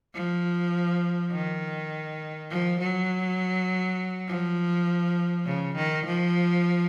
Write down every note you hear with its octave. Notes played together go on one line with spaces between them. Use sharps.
F3
D#3
F3
F#3
F3
C#3
D#3
F3